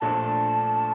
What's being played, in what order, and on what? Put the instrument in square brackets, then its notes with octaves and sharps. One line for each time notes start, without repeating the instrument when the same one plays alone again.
[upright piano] A#1 A#2 A3 D4 [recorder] A5